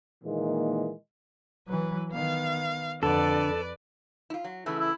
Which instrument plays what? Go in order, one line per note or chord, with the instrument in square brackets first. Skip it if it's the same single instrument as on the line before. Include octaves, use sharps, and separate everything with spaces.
[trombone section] A#2 D#3 E3 G#3 A#3
[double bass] E3 F#3 [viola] B4
[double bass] D#3 B3 [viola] F5
[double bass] F2 [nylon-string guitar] D3 [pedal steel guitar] A4 [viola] B4 D5
[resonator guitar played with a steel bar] E4 F4
F#3
[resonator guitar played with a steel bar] C#3 E3 A3 [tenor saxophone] E4
[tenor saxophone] E4